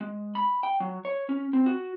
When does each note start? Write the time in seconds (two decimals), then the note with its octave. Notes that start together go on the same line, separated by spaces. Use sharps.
0.01 G#3
0.35 B5
0.63 G5
0.80 F#3
1.05 C#5
1.29 C#4
1.53 C4
1.66 F#4